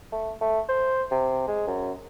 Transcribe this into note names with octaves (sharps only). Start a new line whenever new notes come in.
A3
A3
C5
C3
G#3
F#2